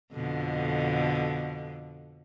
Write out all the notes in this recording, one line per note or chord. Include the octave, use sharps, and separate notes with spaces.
F2 B2 D3